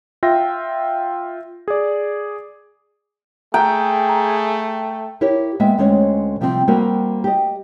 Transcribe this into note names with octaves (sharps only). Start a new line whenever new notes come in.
F4 E5 G5 A#6
G#4 D5
A3 G#4 G5 A#5
A#5
E4 G4 A#4 C#5
G#3 A#3 B3 B4 E5 G5
D2 G#3 C4 C#4 C#5
C3 F3 G3 A#3 C4
G3 A#3 C4 F#4 A#4
G4 D#5